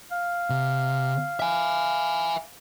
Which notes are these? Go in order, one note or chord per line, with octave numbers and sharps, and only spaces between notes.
F5
C3
E5 G#5